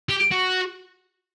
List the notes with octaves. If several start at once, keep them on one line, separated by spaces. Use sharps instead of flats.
G4
F#4